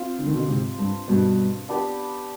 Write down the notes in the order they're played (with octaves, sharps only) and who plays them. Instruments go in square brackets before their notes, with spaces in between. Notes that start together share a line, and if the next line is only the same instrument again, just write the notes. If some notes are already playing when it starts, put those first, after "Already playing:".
Already playing: [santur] C4 F4 C5
[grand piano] D3
D#3
B2 D3
G#2 C3
G2
G2 B2
[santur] B3 D4 G4 B4